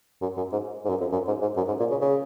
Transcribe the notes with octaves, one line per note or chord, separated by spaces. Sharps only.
F#2
F#2
G#2
G#2
F#2
F2
F#2
G#2
G#2
F#2
G#2
A#2
C#3
C#3